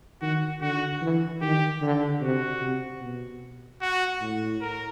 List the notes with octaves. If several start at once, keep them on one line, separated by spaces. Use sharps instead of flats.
D#3 F#4
D3 F#4
E3
D#3 G4
D3
C3 F#4
C3
B2
F#4
A2
A#4